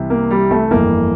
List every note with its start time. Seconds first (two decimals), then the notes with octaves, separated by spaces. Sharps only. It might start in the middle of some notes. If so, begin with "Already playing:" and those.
Already playing: C2 C3 E3
0.10 A#3
0.31 G3
0.51 A3
0.71 G1 F2 E3 A#3